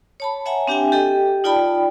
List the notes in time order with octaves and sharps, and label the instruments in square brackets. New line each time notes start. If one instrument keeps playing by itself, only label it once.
[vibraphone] C#5 A5 B5
C#5 E5 F#5 G#5 A#5
C4 D4 G4 E5 G5 G#5
G4 A4 D#5 G5
D#4 F4 D5 G5 A5 B5